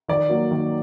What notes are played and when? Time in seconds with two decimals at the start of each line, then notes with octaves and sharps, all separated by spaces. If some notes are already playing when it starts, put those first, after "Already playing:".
0.08 D#3 D5
0.29 F#3 A#3
0.51 D#3